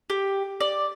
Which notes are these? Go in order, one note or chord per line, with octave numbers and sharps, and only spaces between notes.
G4
D5